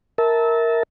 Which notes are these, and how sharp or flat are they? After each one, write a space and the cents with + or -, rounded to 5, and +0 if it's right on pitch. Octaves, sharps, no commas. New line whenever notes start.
A#4 +0 E5 -25 A5 -5